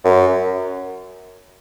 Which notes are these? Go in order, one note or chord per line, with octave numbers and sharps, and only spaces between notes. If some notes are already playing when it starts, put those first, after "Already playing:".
F#2